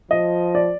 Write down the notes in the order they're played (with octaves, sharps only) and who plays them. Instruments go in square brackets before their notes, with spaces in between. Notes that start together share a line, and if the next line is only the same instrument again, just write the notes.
[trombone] F3 [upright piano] D#5
[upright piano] D5